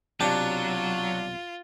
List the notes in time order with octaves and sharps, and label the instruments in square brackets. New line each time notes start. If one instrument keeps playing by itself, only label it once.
[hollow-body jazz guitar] B1 C3 G5 [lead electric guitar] F#3 [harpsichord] D4 [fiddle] F4